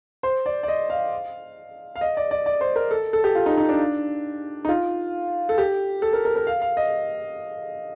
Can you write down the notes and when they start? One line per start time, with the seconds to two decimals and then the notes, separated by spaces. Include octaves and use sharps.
0.23 C5
0.46 D5
0.63 D5
0.68 D#5
0.90 F5
1.96 F5
2.01 D#5
2.17 D5
2.31 D5
2.46 D5
2.61 C5
2.76 A#4
2.91 A4
3.13 A4
3.24 G4
3.35 F4
3.46 D#4
3.57 D#4
3.69 D4
4.65 D#4
4.69 F4
5.49 A4
5.58 G4
6.02 A4
6.13 A#4
6.25 A#4
6.36 A#4
6.47 F5
6.62 F5
6.77 D#5